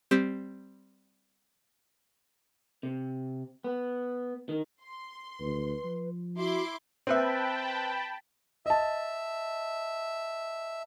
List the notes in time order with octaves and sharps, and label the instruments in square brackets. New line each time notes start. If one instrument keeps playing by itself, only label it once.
[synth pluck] G3 C4 G4
[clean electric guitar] C3
B3
D#3
[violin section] C6
[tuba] D2 [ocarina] B4
[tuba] F3
[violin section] E4 C6 D6 [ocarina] F#4
[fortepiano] C4 B4 E5 [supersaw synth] G5 A5 B5
[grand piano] D#5 A5 [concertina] E5